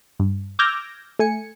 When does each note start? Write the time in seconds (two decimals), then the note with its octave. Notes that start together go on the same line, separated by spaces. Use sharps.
0.20 G2
0.59 D6 E6 F6 G6 G#6 A#6
1.19 A3 G#5 C#7